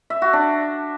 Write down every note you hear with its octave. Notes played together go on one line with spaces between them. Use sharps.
E5
F#4
D4